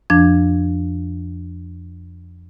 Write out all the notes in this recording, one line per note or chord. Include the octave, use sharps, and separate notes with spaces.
F2 F3 D4 G#6